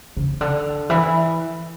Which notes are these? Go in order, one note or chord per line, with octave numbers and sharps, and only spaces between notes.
C#3
D3
E3